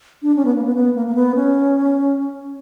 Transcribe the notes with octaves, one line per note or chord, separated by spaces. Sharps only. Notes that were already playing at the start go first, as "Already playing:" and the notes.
D4
C#4
B3
A#3
B3
B3
A#3
A#3
B3
C#4